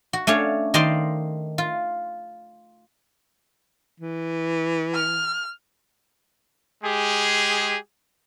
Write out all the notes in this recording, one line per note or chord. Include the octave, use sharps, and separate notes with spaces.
F#4
A3 C#4 D4 C#5 F5
D#3 C5 D5 D#5 F5 C6
F4
E3
F6
G#3 G4 G#4